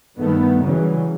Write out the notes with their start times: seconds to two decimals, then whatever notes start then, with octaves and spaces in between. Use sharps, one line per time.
0.18 G2 D#3 A3 B3
0.64 C#3 E3 F#3 G3